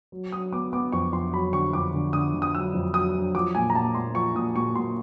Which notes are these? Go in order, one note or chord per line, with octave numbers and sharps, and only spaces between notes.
F#3
F#3 D#6
B3 D6
B3 D6
F2 C#6
F2 C6
F#3 B5
D3 C#6
F2 D6
D3
D3 D#6
D3
D#6
F#3 E6
F2
F#3 D#6
F#3
F3 D6
A#2 G#5
A#5
A#2 A5
A#2 C6
F3 C#6
A#2 D#6
A#2 C#6
A#2 C6